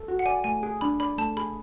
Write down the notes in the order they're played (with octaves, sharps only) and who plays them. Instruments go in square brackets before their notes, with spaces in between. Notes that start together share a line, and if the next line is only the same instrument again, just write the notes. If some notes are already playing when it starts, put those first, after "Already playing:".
Already playing: [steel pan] A4
F#4
[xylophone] F#5
[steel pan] D5 [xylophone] G#5
[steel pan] A3 [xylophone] G#5
[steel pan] G#4
[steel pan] D4 [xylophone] B5
[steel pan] D5 [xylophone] B5
[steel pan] A3 [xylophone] A5
[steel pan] G#4 [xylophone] B5